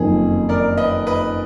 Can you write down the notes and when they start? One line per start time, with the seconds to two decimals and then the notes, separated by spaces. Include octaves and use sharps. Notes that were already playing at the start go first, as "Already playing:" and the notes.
Already playing: F#1 F2 D#3 G#4
0.49 A#4 D5
0.78 B4 D#5
1.07 B4 D#5